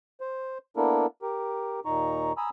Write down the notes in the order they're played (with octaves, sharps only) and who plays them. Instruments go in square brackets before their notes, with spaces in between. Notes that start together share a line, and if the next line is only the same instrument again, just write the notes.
[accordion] C5
A#3 B3 D4 E4 A4 A#4
G4 A#4
D#2 A#2 D#4 A#5 C#6
G#5 A#5 B5 D#6 E6